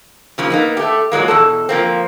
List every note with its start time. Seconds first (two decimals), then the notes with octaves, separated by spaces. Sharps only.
0.38 C#3 F3 A#3
0.50 A#3 B3 D#4
0.77 A3 G4
1.12 A#2 F#3 G#3 A#3
1.28 E2 B2 A4
1.69 F3 A#3 C4